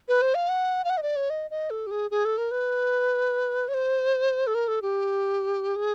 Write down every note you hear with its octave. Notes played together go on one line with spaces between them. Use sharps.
B4
C5
F5
F#5
F5
F#5
D#5
D5
C#5
D#5
D#5
A4
G4
G#4
G#4
A4
A#4
B4
C#5
C5
A4
A#4
A4
G4
G#4